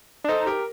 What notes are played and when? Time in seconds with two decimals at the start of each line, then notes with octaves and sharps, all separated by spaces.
0.24 D4
0.28 D#4 A4 C5
0.46 G4 A#4